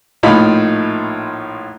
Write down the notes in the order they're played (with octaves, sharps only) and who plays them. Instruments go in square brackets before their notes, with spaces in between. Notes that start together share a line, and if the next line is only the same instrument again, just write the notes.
[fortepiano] A#1 A2 D#4 F4 F5 B5